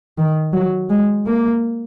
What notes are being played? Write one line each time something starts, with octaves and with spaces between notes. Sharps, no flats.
D#3
F#3
G#3
A#3